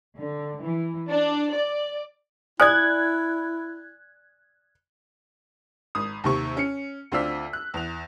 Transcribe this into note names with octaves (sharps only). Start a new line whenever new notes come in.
D3
E3
D4
D5
E4 D5 G#5 D#6 F#6 G#6
G#1 D#6
D#2 C3 C#6
C#4 C#7
D2 C4 F4 D5 E6 B6
F#6
E2 F7